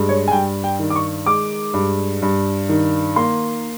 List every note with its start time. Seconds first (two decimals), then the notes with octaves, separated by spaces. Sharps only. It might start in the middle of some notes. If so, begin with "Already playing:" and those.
Already playing: G2 G#3
0.09 C#5
0.28 G#5
0.31 G2 G5
0.64 G5
0.79 D#3
0.90 D6
0.96 C#6
1.26 G#3 D6
1.74 G2
2.22 G2
2.69 D#3
3.16 A#3 C6